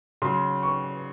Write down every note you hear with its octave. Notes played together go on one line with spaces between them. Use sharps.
C#3 F#3 C6
C#6